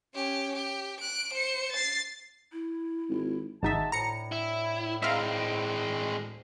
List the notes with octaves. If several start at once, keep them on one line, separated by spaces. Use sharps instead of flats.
C#4 G4
G4
F#6 D7
C5 C#7
A6 C7
E4
G#1
G#1 G#3 D#4 F#4 E5 A5
D2 A2 A#5 C#7
E4
G#3 C4 E5 F5 A#5